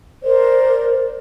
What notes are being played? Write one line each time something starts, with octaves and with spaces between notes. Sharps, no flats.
A#4 C5 D5